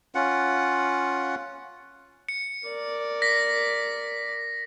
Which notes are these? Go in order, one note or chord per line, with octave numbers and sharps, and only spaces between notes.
C#4 F4 F#5
C#7
A#4 D5
A#6 B6